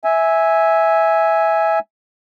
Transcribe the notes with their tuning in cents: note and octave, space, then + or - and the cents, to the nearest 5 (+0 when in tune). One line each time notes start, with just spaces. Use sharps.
E5 -10 G#5 +0